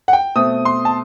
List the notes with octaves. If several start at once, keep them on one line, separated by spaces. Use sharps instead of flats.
F#5
G5
B2 A3 C4 D#6
C6
A5